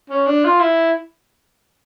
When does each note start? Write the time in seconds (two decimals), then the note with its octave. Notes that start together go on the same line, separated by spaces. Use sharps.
0.10 C#4
0.27 D4
0.44 F4
0.60 E4